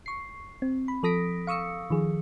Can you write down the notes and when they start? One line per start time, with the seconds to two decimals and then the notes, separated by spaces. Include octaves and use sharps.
0.06 C#6 C7
0.62 C4
0.88 B5
1.03 F3 A4 D#6 A#6 B6 D7
1.47 F5 C#6 D#6 E6 C#7
1.90 D#3 F3 G#4